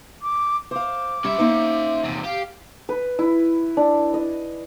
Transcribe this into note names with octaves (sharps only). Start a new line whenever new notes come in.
D6
C5 F5 D6
G3 C#4 E5
A#3 D#4 C5
E2 C3
G4 F5
B4
E4
D4
D#5